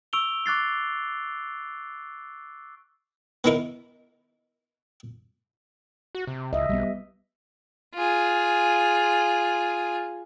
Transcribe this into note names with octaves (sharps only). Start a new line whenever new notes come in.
C#6 E6 D7 F7 G7
C#6 D6 F#6 A6 C7
B3 C#4 D#4 E4 A#4 B4
F#4
C3
C#2 D#5 E5
B1 G3 B3
F4 G#4